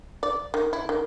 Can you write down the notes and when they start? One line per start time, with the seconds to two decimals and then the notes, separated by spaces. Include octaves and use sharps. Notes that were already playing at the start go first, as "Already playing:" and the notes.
0.23 D5
0.54 D#3
0.73 E4
0.89 D#3